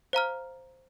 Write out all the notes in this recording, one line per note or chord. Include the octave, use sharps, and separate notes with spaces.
C5 F5 A#5 F6